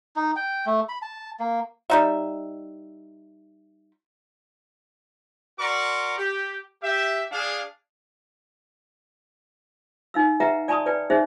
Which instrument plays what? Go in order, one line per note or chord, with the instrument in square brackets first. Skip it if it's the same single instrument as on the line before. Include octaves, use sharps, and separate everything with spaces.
[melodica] D#4
G5
A3
B5
A5
A#3
[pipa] G3 D#4 E5
[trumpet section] F#4 A#4 D5 A#5 C6 C#6
G4
G4 E5
D4 G#4 F5
[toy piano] D#4 F5 E6
B4 D#5 E5 F#5 G5 A#5
D5 G#5 A5 B5 C#6 D#6
B4 D5 G5 G#5
C#4 D#4 G#4 C5 E5